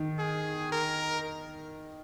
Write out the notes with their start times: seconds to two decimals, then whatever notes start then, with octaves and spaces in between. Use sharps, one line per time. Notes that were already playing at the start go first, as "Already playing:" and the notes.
Already playing: D#3
0.19 G#4
0.72 A#4